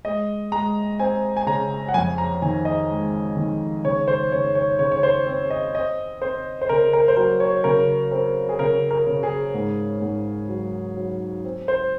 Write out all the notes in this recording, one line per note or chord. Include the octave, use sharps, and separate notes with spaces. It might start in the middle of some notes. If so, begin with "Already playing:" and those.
G#3 D#5
G#3 A#5
C4 G#5
G#5
C#3 A#5
F#5
F2 G#5
A#5
D#3 G#5
D#5
G#3
D#3
C#3 C#5
C5
C#3 C#5
C#5
C#3 C#5
C#5
C5
C4 C#5
D#5
C4 D#5
C4 C5
C5
C#3 A#4
A#4
C5
F#3 A#4
C#5
C#3 A#4
C4 A#4
G#4
C#3 A#4
A#4
C#3
G#4
G#2
G#2
F#3
F#3
C4
C5